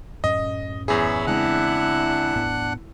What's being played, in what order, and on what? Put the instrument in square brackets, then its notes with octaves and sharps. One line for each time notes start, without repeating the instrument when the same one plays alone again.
[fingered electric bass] F#2 A2 C#4 [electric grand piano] D#5
[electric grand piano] E2 G#4 [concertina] C#5 E5 B5
[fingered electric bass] C#3 G#3 C4 [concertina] D4 F#5 F#6 [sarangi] E4
[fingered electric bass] E1 A2 B3